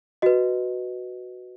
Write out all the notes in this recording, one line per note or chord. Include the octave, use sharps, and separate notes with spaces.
F#4 B4 D#5